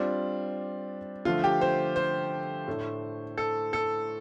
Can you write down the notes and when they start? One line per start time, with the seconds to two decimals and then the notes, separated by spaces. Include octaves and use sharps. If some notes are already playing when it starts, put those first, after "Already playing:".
Already playing: G3 C4 D4 F4
1.25 D3 F3 A3 F4
1.44 G4
1.61 C5
1.96 C5
2.68 A2 A3 D4
3.38 A4
3.73 A4